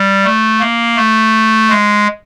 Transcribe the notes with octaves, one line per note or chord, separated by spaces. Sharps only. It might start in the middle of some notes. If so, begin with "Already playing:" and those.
Already playing: G3
A3
A#3
A3
G#3